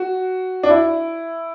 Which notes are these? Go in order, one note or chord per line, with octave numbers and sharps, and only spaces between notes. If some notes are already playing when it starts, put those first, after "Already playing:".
Already playing: F#4
D4
E4